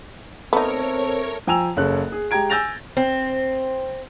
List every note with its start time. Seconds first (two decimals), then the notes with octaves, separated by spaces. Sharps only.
0.53 A3 B3 C4 D#4 A#4 C#5
1.47 F3 G5 G#5 A#5 E6 F7
1.77 F#1 C#4 A4 F#6
2.12 G#4
2.31 G#3 G4 G5 A#5 G#6 D7
2.50 G#5 E6 G6 A6 A#6 F7
2.97 C4